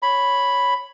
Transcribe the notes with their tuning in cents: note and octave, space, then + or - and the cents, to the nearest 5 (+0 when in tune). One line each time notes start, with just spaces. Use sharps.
C#5 +0 B5 +0